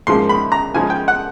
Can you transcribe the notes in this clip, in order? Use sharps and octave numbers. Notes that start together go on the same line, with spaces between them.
G#2 F3 A#3 C6
B5
A#5
C#3 F3 G#3 G#5
G5
F#5